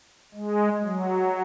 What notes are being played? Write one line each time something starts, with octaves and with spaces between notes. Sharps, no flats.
G#3
F#3